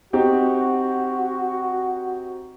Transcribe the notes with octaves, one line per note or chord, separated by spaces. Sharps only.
C4 D#4 F#4 G4